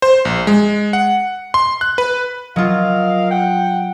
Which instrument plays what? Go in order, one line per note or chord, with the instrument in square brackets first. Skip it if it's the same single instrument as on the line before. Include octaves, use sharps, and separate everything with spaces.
[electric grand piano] C5
A#1
G#3
F#5
C6
F#6
B4
[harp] F#3 F4 [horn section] A#4 D#5 F5
[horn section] F#5 G5